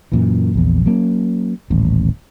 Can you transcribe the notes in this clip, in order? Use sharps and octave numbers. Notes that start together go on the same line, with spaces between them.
F#2 A#2 E3
A#1 E2
F#3 A#3 B3 C#4
D#1 A1